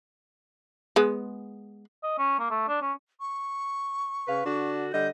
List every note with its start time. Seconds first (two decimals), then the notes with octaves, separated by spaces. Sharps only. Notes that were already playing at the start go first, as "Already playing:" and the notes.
0.96 G#3 B3
2.03 D#5
2.18 C#4
2.39 A#3
2.50 A3
2.68 D4
2.82 C#4
3.20 C#6
4.27 C#3 B4 F5
4.45 D3 D4 F#4
4.93 D3 G3 D#5 G6